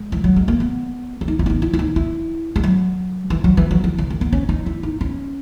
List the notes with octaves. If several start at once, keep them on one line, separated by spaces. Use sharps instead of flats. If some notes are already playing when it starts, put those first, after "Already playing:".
Already playing: G#3
E3
F#3
G#3
A#3
B3
C#4
D#4
E4
C#4
D#4
E4
E4
D#4
E4
G#3
F#3
E3
F#3
E3
F#3
E3
C#3
D#3
B3
C#4
D#4
E4
D#4
C#4